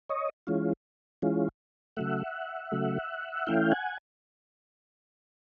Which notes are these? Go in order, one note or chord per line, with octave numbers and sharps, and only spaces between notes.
C#5 D#5
E3 G#3 C#4 F4
E3 G#3 C#4 F4
C#3 F#3 A3 E5 F#5
C#3 F#3 A3
E3 A3 C#4 E4 F5 G5
F#5 G#5